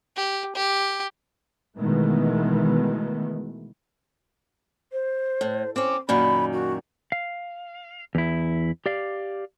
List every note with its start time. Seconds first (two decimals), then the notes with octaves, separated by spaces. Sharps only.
0.16 G4
0.55 G4
1.78 B2 D#3 E3 G#3 A3 B3
4.92 C5
5.41 A2
5.76 C4 C#4 D6
6.09 F#2 A#2 D#3 B5
6.53 F#4
7.12 F5
8.15 E2 E4
8.86 G4 D5 F5